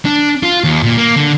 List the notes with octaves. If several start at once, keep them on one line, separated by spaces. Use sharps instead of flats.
D4
F4
D#2
A#2
A#3
D3